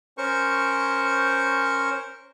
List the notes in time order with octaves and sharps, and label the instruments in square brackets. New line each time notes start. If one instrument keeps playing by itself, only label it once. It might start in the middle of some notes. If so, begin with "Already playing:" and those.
[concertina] C#4 A#4 C5 C#6